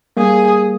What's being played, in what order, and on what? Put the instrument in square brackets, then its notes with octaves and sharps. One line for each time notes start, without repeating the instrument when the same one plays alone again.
[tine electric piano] G3 A#3 [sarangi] G#4